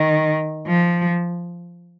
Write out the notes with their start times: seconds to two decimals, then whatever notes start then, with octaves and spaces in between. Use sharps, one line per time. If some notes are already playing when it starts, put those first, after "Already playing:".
Already playing: D#3
0.68 F3